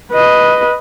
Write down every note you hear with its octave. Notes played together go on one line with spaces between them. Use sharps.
B4 D#5